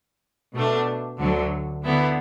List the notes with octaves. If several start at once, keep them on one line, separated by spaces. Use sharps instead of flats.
B2 A3 D4
D2 D3 F#3
D3 B3 E4